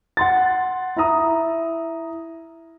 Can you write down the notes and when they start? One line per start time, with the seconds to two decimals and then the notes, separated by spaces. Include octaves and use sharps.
0.17 F#5 C6 A6
0.96 E4 E5 A#5 D#6